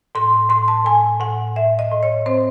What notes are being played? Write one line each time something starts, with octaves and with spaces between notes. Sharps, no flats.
A2 C6
A2 C6
A5
A2 G#5
A2 F#5
A2 E5
D#5
A2
C#5
C4 C5